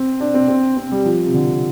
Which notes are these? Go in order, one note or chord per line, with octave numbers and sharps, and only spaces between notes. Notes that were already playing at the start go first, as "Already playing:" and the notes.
Already playing: C4
D4
C4
C4
C4
G3
F3
C3
D3